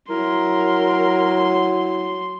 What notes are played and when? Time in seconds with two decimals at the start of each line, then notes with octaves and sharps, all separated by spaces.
0.10 F#3 E4 A#4 C6